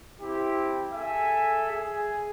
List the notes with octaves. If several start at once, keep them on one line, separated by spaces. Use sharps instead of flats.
C4 E4 G4
G#4 A4 E5 G#5
G#4